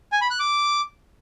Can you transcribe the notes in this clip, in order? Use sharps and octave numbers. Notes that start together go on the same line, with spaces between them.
G#5
B5
F#6
D6